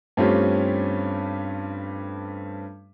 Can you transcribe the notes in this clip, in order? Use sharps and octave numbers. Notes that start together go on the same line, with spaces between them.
G2 A3 C4 C#4 F4 G4